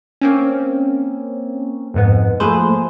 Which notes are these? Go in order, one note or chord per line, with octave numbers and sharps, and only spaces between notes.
A#3 C4 C#4
F2 G#2 B3
F3 A3 A#3 G#4 B4 C5